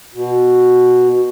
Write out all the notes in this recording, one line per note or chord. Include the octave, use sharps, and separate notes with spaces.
B2